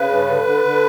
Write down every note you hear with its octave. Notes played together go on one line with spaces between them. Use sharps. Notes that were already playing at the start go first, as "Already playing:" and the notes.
Already playing: C#3 B4
G2
D3
D3
D3